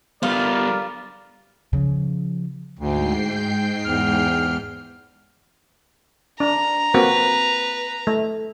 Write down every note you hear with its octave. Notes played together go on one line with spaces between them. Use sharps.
G3 B3 F4 A#4 D5
C#3 F3
D2 G#2 G5 C7
G6
E2 F6
D4 A#5
A#3 C4 F#4 B4
A3